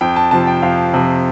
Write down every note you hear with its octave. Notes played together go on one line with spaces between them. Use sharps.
F2 G5
A5
C3 F3 A5
G5
F2 F5
C3 F3